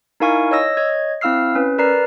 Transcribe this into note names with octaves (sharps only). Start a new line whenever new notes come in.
D#4 E4 A#4 F5 G#5 C#6
C#5 D#5 E6 A#6
C#5 D#5 G#6
C4 E4 F5 E6 F6 C7
C#4 B4
A#4 B4 D5 A#5 C7